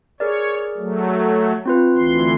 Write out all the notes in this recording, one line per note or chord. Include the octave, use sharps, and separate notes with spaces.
G#4 A#4 C#5 D5
F#3 A3
C4 F4 B4
D2 E3 C6